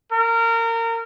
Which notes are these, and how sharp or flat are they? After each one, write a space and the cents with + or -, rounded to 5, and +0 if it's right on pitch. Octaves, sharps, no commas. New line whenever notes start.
A#4 -25